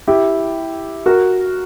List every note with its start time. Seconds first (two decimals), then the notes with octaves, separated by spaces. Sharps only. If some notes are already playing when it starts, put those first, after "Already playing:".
0.08 E4 G4
1.06 F#4 A#4